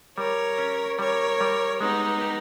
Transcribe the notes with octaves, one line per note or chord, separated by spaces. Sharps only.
G3 A#4 C#5
C#4
G3 A#4 C#5
G3
G#3 B3 D#4
G4